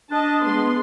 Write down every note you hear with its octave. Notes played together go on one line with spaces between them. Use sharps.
D4 D#5 A5
G#3 B3 C6